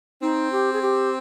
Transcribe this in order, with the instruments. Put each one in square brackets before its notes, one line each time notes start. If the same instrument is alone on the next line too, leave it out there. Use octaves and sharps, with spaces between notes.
[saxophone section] C4 [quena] D#4
[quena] G4
G#4
G4